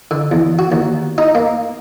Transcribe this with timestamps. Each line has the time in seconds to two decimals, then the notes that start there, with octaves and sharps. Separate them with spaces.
0.11 D3
0.31 E2
0.59 F#4
0.72 D#2
1.18 D#4
1.35 A#3